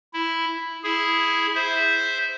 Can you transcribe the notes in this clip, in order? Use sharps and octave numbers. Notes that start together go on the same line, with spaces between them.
E4
E4 G#4
C5 E5